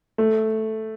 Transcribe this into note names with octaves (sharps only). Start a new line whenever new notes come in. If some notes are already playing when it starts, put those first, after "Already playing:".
A3